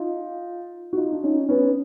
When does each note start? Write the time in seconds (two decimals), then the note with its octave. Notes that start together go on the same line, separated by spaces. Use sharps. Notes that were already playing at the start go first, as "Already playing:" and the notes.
Already playing: D#4 F4
0.93 F#4
0.97 D#4 F4
1.12 D4
1.23 C#4 D#4
1.49 B3 C#4